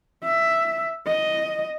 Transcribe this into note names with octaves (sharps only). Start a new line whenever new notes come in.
E5
D#5